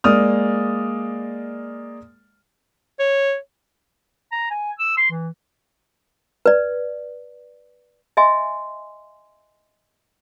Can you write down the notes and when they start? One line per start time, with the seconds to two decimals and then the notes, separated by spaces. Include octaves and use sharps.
0.04 G#3 A#3 D5 D#6 F6
2.99 C#5
4.32 A#5
4.50 G#5
4.79 E6
4.97 C6
5.11 E3
6.46 B4 D5
8.17 D#5 E5 G#5 C6